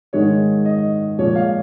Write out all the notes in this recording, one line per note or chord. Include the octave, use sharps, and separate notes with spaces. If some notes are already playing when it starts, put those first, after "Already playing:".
G#2 D#3 G#3 C#5
D#5
A#2 F3 G#3 C#5
F5